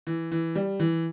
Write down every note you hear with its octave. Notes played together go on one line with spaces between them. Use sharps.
E3
E3
G3
E3